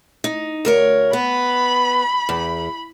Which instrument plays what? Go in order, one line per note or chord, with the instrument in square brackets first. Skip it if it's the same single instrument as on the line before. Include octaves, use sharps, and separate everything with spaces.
[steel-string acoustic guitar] D#4
D2 A#4 C#5
[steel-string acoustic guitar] B3 [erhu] B5
[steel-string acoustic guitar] E2